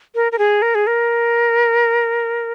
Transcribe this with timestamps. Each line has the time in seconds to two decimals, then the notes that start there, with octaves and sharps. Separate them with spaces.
0.15 A#4
0.32 A#4
0.38 G#4
0.62 A#4
0.75 G#4
0.87 A#4